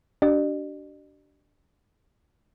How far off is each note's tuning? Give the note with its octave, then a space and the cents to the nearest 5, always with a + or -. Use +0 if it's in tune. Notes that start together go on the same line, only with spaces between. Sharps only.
D4 -10 G4 -45 D5 +45